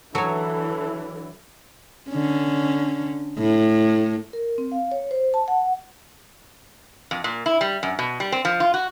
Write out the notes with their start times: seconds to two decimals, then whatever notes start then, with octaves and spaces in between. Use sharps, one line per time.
0.15 D3 E3 F#3 A4 C#5
2.10 D3 C#4
3.38 A2
4.33 A#4
4.58 C4
4.72 F5
4.92 C#5
5.11 C5
5.34 A5
5.48 F#5
7.11 F2
7.24 A#2
7.46 E4
7.61 G3
7.83 F#2
7.99 B2
8.20 G3
8.32 C4
8.45 F3
8.60 F4
8.74 F#4